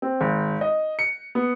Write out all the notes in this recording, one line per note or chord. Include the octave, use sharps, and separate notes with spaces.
C4
G#1
D#5
C#7
B3